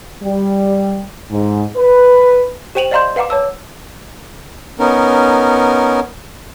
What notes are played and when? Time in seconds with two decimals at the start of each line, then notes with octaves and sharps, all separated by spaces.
0.23 G3
1.31 G#2
1.77 B4
2.75 G4 C5 G5 D#7 F7 F#7
2.91 D5 D#5 F5 A#5 C6 G6
3.16 B4 F5 F#5 A#5 D6
3.30 C#5 A5 E6
4.79 B3 C#4 D#4 A#4